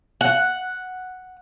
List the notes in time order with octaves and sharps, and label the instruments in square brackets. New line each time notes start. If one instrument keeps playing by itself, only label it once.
[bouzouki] F#5